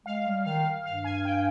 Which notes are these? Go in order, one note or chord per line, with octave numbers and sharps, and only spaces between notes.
G#3 F5
G3
D#3 F5
G2 F5
G#5
G5